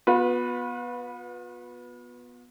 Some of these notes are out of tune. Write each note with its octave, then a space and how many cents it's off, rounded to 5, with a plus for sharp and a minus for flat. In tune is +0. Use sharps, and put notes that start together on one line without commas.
B3 -10 F4 +45 B4 +0